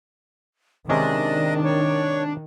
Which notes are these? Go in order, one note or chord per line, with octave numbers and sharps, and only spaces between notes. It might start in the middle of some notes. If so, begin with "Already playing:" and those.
C3 D#3 G#3 C#4 D4 D#5
C#5